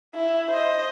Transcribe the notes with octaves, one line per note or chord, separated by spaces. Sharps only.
E4
C5 D#5